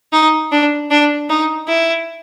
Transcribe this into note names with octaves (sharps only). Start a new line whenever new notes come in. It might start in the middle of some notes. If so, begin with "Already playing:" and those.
D#4
D4
D4
D#4
E4